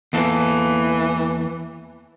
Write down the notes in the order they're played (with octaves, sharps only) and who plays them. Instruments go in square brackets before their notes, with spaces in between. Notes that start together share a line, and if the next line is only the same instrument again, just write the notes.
[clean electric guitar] E2 A#3 A4 [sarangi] E3